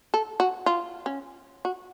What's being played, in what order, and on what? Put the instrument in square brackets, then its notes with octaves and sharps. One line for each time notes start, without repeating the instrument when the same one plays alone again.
[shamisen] A4
F#4
F4
C#4
F#4